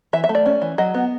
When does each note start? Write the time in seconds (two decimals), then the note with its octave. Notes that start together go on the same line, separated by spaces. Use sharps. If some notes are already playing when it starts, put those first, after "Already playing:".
0.13 E3 E5
0.24 E5
0.29 A3
0.35 D5
0.46 C#4
0.62 E3
0.78 F#3 D#5
0.94 B3